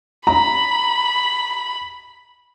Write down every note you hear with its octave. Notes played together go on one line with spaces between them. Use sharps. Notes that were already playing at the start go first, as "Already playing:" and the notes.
A#5 B5